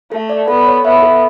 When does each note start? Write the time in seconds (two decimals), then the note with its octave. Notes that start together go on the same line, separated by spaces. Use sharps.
0.12 A3 A4
0.29 D5
0.48 B3 A4
0.66 C#5
0.85 B3 E5
1.02 A4